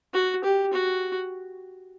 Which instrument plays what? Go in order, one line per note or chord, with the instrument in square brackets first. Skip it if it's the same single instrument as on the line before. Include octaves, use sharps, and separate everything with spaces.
[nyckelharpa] F#4
G4
F#4